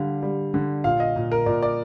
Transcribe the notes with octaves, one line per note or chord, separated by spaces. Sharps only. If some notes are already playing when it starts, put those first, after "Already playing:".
Already playing: D3 G3 F5
G3
D3
A#2 F5
D#5
A#2
A#4
A#2 D5
D5